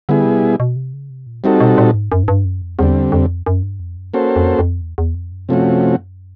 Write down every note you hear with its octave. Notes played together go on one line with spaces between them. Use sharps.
D3 G3 B3 E4 G#4
C3
B2
B2
C3
C#3
C3
A#2
G3 C4 D#4 F#4 A4
B2
A#2
G#2
F#2
G#2
G2
F#2
F2
E2 D3 G3 C4
F2
F#2
G2
F2
F#2
A#3 C#4 F#4 A4 C5
F2
F2
E2
E2
F2
F#2
C3 F3 A3 C#4 F#4